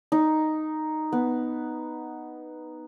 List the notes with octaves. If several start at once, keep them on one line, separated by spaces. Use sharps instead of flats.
D#4
B3